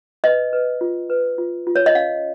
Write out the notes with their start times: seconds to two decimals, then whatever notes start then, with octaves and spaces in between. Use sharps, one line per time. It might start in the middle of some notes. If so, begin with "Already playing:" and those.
0.24 B4 D#5
0.53 B4
0.81 F4
1.10 B4
1.38 F4
1.67 F4
1.76 C#5
1.86 D#5
1.95 C#4 F5